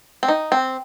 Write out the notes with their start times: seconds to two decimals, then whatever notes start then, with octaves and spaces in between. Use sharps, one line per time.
0.23 C4
0.28 D#4
0.52 C4